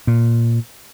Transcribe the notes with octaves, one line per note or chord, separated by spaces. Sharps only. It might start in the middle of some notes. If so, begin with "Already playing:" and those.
A#2